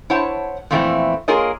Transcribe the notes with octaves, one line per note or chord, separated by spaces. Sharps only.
E4 C5 C#5 F#5 A5
F2 A#2 E3 A3 C4 E4
A#3 F4 G#4 A#4 C#5 D#5